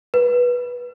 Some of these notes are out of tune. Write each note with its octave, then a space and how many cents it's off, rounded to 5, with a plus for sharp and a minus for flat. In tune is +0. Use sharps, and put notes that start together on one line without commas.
B4 -15